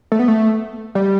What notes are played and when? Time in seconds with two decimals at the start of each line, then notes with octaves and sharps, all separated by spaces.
0.12 A3
0.19 B3
0.28 A3
0.95 G3